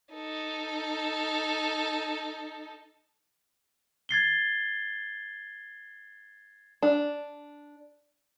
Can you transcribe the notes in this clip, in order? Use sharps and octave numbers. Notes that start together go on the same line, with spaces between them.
D#4 A4
G#6 A6 C7 G7
D4